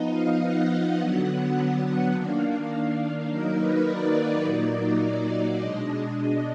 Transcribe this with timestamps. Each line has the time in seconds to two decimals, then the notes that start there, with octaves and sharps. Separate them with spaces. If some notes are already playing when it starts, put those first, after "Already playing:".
Already playing: F3 B3 D#4 D#5
0.13 F5
0.41 F#5
0.99 D3 F#3 B3 F#5
2.14 D#3 A#3 D4 F5
3.29 D#3 F#3 A#3 D#4 A#4
3.58 B4
3.87 D5
4.44 A#2 F#3 A#3 D#4
5.58 B2 G#3 D4 D#5